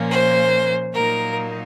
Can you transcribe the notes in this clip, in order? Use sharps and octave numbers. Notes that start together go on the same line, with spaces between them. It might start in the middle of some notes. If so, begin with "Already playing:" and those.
Already playing: A#2 F3 A#3 C#4
C5
A#2 F#3 A#3 D#4 A#4